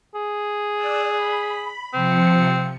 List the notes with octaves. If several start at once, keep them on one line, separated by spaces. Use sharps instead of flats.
G#4
D5 E6 F#6
B5
C3 F3 C4 C#7